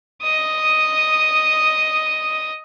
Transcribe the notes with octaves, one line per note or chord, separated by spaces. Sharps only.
D#5 D#6